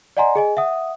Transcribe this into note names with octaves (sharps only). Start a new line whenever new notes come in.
D5 D#5 F#5 G#5 A#5 C6
G#4 D#5 G#5
E5 F#5 D#6